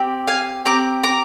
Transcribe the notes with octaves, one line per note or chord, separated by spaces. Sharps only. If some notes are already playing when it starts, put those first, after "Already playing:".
Already playing: C4 G4
F5 G#5
C4 G4 A#5 D6
A#5 D6